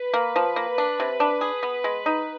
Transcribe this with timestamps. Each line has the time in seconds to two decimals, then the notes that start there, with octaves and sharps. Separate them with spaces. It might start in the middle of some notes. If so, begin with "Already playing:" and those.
Already playing: B4
0.14 A#3
0.36 F3
0.56 A#3
0.78 D4
1.00 C3
1.20 D4
1.41 G#4
1.63 B3
1.84 G#3
2.06 D#4